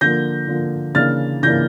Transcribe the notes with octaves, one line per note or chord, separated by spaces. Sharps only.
D3 F3 A#3 G6 A#6
D3 F3 A#3
C#3 E3 A#3 D4 F6 A6
C#3 E3 A#3 D4 G6 A#6